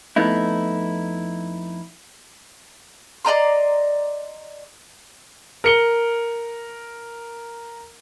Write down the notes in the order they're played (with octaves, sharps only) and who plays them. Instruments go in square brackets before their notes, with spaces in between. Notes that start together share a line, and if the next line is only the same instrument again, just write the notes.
[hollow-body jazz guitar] F2 A3 B3 D#4 E4
[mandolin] D5 D#5 A#5 C6
[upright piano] A#4 C#7 G7